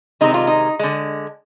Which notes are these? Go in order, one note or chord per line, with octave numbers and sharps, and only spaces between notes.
C3 D#3 G#3 D#4
F4
D#4
D3 G#3